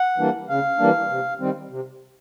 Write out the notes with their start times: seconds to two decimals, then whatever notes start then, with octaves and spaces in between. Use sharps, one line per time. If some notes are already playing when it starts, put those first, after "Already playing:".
Already playing: F#5
0.18 E3 G3 A#3 D4
0.49 C#3 F5
0.79 E3 G3 A#3 D4
1.09 C3
1.40 D#3 G3 C4
1.70 C3